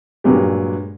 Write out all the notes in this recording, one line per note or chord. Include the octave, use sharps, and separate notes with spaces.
G2 A#2 F#3 G#3 G4